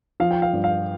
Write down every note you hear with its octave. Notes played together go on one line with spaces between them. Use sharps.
F3 F5
G5
F5
G2
F5